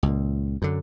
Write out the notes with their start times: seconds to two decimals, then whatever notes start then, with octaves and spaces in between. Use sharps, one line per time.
0.03 C#2 A#2
0.62 F#2 D3